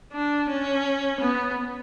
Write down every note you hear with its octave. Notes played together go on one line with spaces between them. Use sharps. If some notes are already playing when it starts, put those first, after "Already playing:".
D4
C#4
B3